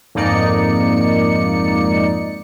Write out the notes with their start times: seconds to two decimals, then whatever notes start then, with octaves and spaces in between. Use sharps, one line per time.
0.15 F2 G#2 A#3 D#4 D5 C#7